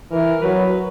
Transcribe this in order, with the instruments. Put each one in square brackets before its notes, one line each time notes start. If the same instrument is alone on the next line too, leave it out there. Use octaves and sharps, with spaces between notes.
[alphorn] E3 [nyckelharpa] A#4
[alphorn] F#3 [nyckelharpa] B4